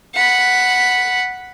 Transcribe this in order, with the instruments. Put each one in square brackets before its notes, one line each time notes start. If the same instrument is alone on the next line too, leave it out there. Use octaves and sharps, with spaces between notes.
[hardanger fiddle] F#5 B5